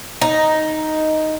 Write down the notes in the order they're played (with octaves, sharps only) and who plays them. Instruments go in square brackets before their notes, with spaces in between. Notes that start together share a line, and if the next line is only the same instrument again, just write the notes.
[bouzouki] D#4